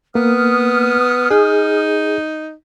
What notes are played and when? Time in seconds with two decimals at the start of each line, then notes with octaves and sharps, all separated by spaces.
0.15 A#3 B3 D#6 F6
1.31 D#4 G#4